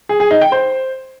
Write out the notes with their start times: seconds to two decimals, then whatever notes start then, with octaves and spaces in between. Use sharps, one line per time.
0.09 G#4
0.20 G#4
0.31 D#4
0.41 G5
0.52 C5